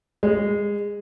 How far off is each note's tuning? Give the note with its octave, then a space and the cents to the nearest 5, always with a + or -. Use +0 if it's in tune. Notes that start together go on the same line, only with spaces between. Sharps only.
G#3 -20